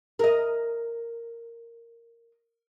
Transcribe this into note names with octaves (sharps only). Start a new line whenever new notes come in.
A#4 D#5